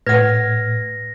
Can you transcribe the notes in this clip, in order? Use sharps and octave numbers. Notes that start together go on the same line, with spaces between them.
A2 B4 F#5 F6 G#6 A#6